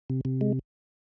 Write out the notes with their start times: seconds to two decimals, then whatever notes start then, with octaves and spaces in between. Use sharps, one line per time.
0.10 C3
0.25 C3
0.41 G#3